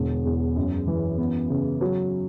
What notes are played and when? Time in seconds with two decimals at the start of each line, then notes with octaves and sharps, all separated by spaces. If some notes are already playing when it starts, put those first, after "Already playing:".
Already playing: E1 D3
0.25 E2
0.56 F#2
0.87 E3
1.18 B3
1.50 C#3
1.81 F#3